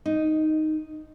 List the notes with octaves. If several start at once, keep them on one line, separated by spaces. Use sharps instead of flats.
D#4